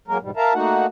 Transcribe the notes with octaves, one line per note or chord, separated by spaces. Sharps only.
F#3 G#3 A#3 A#4
E2 G#2 B2 G3
A#4 E5 F5 A5 A#5
A3 A#3 D#4 F#4 F#5